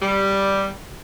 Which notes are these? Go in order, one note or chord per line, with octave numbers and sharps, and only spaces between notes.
G3